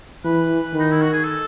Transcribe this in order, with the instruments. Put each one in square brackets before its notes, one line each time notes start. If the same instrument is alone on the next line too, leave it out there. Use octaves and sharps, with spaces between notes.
[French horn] E3 [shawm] B4
[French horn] D#3
[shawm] D#4
E4
F#4
G#4
A4